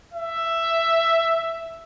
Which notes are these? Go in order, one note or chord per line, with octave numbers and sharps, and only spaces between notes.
E5